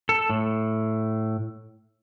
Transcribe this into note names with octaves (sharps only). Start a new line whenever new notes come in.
A4
A2